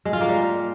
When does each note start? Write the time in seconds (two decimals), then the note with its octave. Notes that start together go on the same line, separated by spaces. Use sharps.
0.05 G#3
0.13 F4
0.21 A#3
0.28 G3